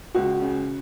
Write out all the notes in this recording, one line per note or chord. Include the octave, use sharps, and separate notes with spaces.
C#2 F#4
C#3